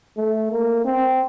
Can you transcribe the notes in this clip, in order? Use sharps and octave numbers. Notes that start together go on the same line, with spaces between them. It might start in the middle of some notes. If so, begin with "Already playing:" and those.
A3
A#3
C4